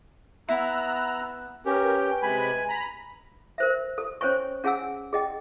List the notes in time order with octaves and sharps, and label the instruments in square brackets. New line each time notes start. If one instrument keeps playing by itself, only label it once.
[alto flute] B3 [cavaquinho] E4 [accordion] A#5 E6 F#6
[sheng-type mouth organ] C#4 G4 [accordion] A#4 [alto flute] B4
[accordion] G5
[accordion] C3 G#3 B5 [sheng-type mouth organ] G#5
[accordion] A#5 B5
[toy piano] A#4 C5 E5
A4
C#4 C5 C#5 G#5 C#6
C#4 G#4 F#5 G#5 E6
G#4 D#5 G5